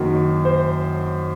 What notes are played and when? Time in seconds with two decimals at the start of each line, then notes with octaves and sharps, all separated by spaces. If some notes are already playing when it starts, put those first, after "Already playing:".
Already playing: F#1 F#2 D#3 F#3
0.45 C5